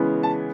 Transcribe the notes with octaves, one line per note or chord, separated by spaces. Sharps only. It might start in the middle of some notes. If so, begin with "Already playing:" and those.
Already playing: C#3 E3 G#3 B3
A5